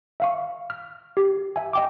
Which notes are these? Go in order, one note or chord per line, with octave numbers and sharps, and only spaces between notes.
E5 F5 C#6
F6
G4
E5 G#5
D#5 G5 D6